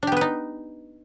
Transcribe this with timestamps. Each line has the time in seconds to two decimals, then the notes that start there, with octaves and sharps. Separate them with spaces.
0.03 D4
0.07 G4
0.12 B3
0.17 B4
0.21 D#4